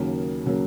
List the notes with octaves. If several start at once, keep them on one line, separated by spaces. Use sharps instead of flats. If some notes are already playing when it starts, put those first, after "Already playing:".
Already playing: D#2 C#3 F#3 A#3
C#3 F#3 A#3